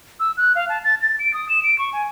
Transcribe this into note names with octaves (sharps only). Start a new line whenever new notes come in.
E6
F#6
F5
A5
A6
A6
D7
D#6
E7
D7
C#6
G#5